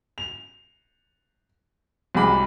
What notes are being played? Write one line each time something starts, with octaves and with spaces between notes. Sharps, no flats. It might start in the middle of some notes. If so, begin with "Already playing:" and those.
F7
C2 F#3 G#3 G#4 B5 D6